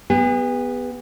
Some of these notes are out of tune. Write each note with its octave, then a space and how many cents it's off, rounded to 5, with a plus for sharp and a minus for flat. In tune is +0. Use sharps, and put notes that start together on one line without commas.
B3 +0 G#4 -45